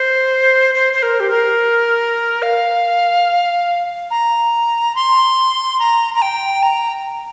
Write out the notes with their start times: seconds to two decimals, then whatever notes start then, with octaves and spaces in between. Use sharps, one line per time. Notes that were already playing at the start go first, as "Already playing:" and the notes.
Already playing: C5
0.74 C5
0.93 C5
1.02 A#4
1.20 G4
1.30 A#4
2.42 F5
4.10 A#5
4.95 C6
5.79 A#5
6.14 A#5
6.22 G5
6.63 A#5